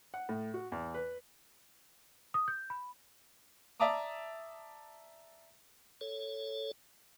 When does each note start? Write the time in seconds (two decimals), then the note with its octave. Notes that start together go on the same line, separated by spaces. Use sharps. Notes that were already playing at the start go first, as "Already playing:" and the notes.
0.14 F#5
0.29 A2
0.54 F#4
0.72 E2
0.94 B4
2.34 D#6
2.48 G6
2.70 B5
3.80 D5 E5 A5 A#5 D6 D#6
6.01 A4 C#5